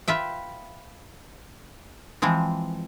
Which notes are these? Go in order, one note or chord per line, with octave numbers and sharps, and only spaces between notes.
F4 B4 E5 G5
E3 F3 G#3 C4